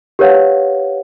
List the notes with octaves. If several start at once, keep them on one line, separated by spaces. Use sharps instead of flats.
G4 A#4 B4 C#5 F5 F#5